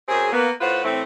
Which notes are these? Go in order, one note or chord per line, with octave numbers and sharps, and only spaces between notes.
F#2 C4 G#4
A#3 B3
A2 F4 B4 C5 F#5
A2 E3 A3 C4